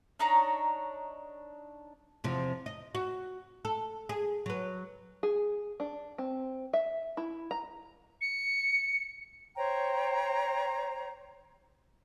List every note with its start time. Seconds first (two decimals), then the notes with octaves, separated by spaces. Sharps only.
0.19 D4 D#4 C#5 A#5
2.24 E2 C3 F3
2.66 D#5
2.95 F#4
3.65 A4
4.09 G#4
4.46 F#3 B4
5.23 G#4
5.80 D4
6.18 C4
6.73 E5
7.17 E4
7.51 A#5
8.21 C#7
9.56 C5 C#5 G5 A#5